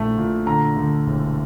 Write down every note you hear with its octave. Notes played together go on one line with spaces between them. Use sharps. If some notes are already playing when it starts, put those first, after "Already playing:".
Already playing: A#1 A3 E4
A#2
D3 A#5
D2
E1